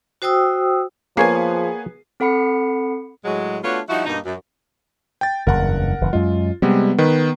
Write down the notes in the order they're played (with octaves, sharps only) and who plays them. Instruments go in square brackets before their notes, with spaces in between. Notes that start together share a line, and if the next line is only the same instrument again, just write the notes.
[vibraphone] F#4 C5 G5 D#6 E6
[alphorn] F3 [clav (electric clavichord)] A#3 C#5 G#5 [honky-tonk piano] B3 G#4 C7
[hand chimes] C4 A4 F#5 B5 C#7
[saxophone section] A2 F#3 G#3
A3 B3 D4 F4 F#4 C#5
F3 G3 D#4 E4 F#4
G2 B2 A#3 D#4
F#2
[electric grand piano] G5 A6
[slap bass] F#1 E2 G2 [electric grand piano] A#4 F#5
[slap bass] F#1 E3
[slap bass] F#2 G#3 [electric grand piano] F4
[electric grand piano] C3 G3 G#3 [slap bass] B3
[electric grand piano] D#3 B4